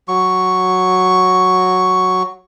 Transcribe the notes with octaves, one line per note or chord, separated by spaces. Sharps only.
F#3 C#6